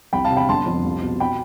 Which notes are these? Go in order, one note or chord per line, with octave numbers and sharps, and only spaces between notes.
C2 G5 B5
F5 A5
C3
G5 B5
G1 A5 C6
F2
C2
B2
G5 B5